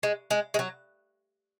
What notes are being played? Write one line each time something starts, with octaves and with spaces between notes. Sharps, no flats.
G#3
G#3
G#3
F#3